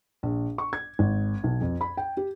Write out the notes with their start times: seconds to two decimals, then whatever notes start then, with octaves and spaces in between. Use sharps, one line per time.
0.23 A#1
0.58 C#6
0.73 G#6
0.99 G#1
1.44 B1
1.61 F2
1.81 B5
1.97 G5
2.17 G4